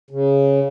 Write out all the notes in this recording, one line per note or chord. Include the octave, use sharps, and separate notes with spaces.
C#3